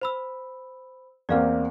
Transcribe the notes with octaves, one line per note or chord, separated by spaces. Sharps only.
C5 B5 E6
E2 A#3 C4 D5 F5 F6